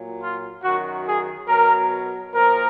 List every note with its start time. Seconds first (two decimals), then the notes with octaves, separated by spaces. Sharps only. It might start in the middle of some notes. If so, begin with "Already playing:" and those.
Already playing: A#2 F#3
0.21 F4
0.63 F#2 D#3 F#3 F#4
1.06 G#4
1.48 B2 F#3 A#4
2.33 A#2 F3 A#4